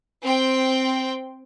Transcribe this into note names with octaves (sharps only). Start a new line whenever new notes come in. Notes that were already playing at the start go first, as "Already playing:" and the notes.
C4 G5